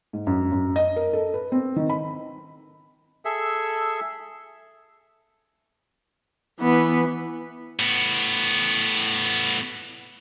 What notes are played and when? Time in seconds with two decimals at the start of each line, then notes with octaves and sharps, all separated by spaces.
0.13 G#2
0.27 F#2
0.52 F#2
0.76 D#5
0.96 A#4
1.13 A4
1.34 B4
1.52 C4
1.76 D#3
1.90 B5
3.25 G#4 A4 E5
6.61 E3 B3
7.79 A2 B3